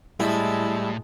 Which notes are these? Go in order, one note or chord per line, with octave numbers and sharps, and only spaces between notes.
A2 G3 G#3 E4 A5